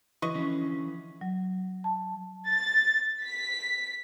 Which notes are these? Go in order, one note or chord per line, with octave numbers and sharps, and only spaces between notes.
E3 B4 D#5 C#6
D3 F3 C#4
F#3
A5
A6
B6